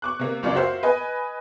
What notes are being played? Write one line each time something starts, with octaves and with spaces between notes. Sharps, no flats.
C#6 D6 F#6
C3 A#3
F#1 C#2 F#2 F4 D5
F#4 A#4 C5 E5 F5
B4 D#5 G#5